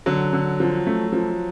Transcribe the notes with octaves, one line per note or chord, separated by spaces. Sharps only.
D3 F#3
D3
F3
A3
F3